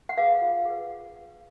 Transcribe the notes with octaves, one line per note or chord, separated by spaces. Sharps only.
F#5
G#4 B4 F5
F4
G#4 B4